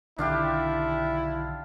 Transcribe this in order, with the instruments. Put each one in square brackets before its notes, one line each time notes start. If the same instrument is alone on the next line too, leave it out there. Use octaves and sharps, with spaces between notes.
[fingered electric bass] B1 D3 D#3 [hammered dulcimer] D4 F4 G4 [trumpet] E4